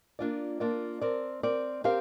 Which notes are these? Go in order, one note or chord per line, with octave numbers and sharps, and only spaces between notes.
A#3 D4 F4 D5
A#3 D4 F4 D5
C4 A#4 D5
C4 A#4 D5
C4 G4 A#4 F5